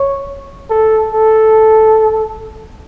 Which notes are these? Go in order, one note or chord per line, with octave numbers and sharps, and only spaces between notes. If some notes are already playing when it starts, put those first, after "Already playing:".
Already playing: C#5
A4
A4